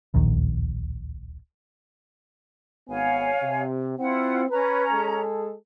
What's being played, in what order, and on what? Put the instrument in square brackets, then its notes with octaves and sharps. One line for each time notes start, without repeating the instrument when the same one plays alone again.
[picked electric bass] D1 A#1 D#2 D#3
[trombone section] G#1 B3 [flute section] C#5 F5 G#5
[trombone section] C3
[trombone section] C4 [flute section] E4 F4 F#5
[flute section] C#4 A#5 [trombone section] B4
[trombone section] G#3 G#4 A4